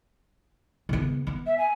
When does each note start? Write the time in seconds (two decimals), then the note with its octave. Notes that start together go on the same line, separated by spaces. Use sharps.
0.89 C#3 B3
1.27 B3
1.46 E5
1.58 G#5